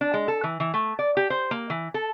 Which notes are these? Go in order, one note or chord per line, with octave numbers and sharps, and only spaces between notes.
D4
G#3
A4
E3
E3
A3
D5
G4
C5
A#3
E3
A4